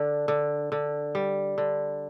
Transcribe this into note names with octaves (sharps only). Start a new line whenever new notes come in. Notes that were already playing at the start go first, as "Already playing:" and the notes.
Already playing: D3 D4
D3
D3
G3
D3